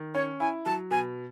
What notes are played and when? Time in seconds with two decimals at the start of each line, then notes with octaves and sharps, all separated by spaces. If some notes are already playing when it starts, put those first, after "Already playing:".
Already playing: D#3
0.15 C#4 C#5
0.40 E4 G#5
0.65 F#3 A5
0.91 B2 G#5